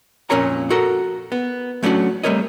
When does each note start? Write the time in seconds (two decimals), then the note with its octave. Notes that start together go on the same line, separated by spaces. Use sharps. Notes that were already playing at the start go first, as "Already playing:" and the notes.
0.30 F2 A#2 C#4 A#4 C#5 A#5
0.70 F#4 A4 A#4
1.32 B3
1.83 F#3 A3 C#4 D4 F#4
2.23 G3 A3 C4 A#4 C#5 D#5